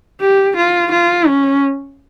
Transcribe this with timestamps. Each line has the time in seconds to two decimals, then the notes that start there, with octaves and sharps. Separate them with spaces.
0.21 G4
0.57 F4
0.92 F4
1.27 C#4